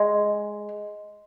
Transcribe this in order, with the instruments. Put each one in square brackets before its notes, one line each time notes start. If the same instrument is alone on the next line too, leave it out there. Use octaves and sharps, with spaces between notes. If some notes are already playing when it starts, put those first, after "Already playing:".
Already playing: [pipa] G#3